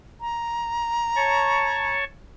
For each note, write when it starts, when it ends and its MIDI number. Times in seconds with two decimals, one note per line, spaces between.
0.21 1.97 82
1.16 2.04 73
1.16 2.04 81
1.16 2.04 85